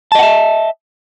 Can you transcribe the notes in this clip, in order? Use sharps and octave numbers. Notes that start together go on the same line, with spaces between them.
D#5 E5 F#5 A5